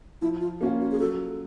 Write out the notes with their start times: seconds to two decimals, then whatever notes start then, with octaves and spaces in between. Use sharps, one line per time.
0.22 F3 E4
0.41 F4
0.61 A#3 C#4 F4 F#4
0.81 F#4
0.91 G#4
1.00 F#3 A4